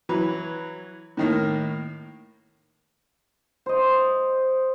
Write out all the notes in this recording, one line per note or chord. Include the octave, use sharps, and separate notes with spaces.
E3 F#3 B4
A2 D#3 A#3
C5 D#5